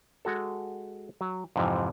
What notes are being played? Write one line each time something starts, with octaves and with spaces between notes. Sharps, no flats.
G#3 F#4 A4
F#3
F2 G#2 C3 E3 F3